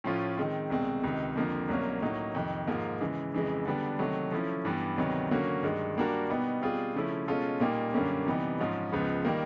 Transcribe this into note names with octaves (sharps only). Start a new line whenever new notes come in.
A2 F3 A3 C#4 F4
D#3 G#3 C4
C2 B2 G#3 C4
C#2 C3 D#3
F2 D3 F3 A#3
C2 B2 F#3 A#3 C#4
A2 F#3 A#3 D#4
F2 C3 D#3
G#2 F3 A#3
C#3 E3 G#3
F2 C#3 E3 G#3
D3 G3 B3 D4
C3 D#3 F#3 A3
F3 A3 C#4 E4
G2 E3 G3 B3
D2 C3 D#3 F#3 B3
D3 F#3 A#3 C#4 F#4
G2 D#3 G#3
G3 A#3 D4 F#4 A#4
B2 G3 B3 D#4
B2 G3 C4 F4 G#4
C#3 F3 A3 C#4 E4
B2 G#3 C#4 F4 A4
A#2 G3 A#3 D#4 G4
F#2 D3 G3 A#3 C#4
C3 E3 G3 B3 D#4
G#2 F3 G#3 C#4
C#2 C#3 F3 G#3 B3
D#3 G3 A#3